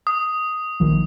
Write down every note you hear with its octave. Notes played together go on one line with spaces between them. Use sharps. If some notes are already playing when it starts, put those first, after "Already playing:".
D#6
A#1 D#3 F3